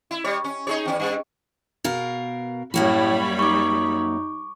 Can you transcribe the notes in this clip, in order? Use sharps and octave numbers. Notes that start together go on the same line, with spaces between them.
E4
G3 C#5
C#4
D#4 G#4 C#5
E2 C#4
G2
B2 A#4 F5
F#2 A2 G3 A#3 F#4 C#5 B5
D#4 C#6 D6